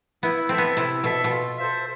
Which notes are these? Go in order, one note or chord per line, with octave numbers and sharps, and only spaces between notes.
B3 E4
C4 A4 E5
B3
C3 E4
B2 A4 E5
B2
F4
A4 C5 E5